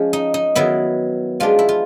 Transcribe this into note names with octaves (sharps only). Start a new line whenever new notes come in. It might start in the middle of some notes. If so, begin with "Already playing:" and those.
Already playing: F3 G#3 C#4
D#4
D#4
D#3 F#3 B3 E4
F3 G#3 B3 D4 F4
E4
F4